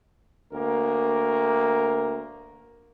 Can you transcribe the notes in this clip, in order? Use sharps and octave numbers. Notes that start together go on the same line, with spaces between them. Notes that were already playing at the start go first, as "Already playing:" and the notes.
D2 A#3 A#4